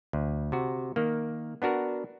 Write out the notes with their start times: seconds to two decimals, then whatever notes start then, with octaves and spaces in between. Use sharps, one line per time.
0.13 D2
0.52 C3 F#4
0.96 D#3 A#3
1.62 B3 D4 F#4 A#4